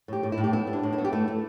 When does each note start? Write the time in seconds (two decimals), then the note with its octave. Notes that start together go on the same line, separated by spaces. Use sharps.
0.08 A2 G4
0.23 A2
0.32 E4
0.38 A2
0.44 G4
0.53 B3 E4
0.67 G3
0.73 D4
0.83 A2
0.93 E4
0.98 B3
1.05 G4
1.12 A3 E4
1.28 A3